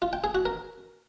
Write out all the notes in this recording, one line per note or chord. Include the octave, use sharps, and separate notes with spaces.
F4
G5
G#4
F#4
A#4